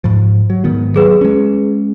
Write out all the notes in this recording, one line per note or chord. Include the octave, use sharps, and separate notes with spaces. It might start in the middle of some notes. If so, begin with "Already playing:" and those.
G#2 F3
F#3
G#2 D#3 B3
F#3 G#4 B4
G#3 C#4